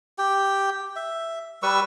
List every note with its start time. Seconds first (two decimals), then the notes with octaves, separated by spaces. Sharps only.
0.18 G4 G5
0.96 E5
1.63 G3 B4 C#6 E6